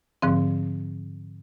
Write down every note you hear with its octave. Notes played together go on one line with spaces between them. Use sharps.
G#2 D3 F3 C4